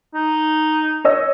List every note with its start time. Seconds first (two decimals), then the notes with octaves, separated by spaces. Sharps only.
0.14 D#4
1.05 C#5 D#5 E6